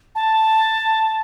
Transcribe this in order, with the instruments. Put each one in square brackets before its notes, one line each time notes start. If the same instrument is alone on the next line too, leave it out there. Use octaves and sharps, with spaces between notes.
[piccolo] A5